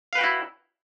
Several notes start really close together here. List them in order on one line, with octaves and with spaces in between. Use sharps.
F5 B4 G5 F#4 E4